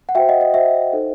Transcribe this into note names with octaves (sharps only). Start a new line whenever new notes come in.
F#5
F#4 C5 E5 G5
D#5 F#5
D#5
F#4 C5 E5
D#4 A4 C5